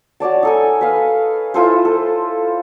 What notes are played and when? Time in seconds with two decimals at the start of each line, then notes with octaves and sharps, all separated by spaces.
0.20 F#4 C#5 D5 A5
0.43 D#4 A4 G#5
0.81 B4 F5
1.54 E4 F4 A4 C5
1.85 A4